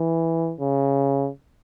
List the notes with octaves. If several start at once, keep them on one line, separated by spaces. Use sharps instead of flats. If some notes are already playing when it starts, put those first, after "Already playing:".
Already playing: E3
C#3